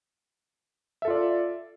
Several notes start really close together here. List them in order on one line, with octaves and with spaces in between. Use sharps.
E5 A4 F4 D5